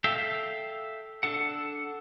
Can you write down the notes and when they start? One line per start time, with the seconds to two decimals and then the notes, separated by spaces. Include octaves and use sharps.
0.04 A4 E5 F5 G5
1.23 D4 A4 F#5